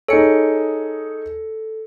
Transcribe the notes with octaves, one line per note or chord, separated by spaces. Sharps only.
D#4 G#4 A4 C#5 C#7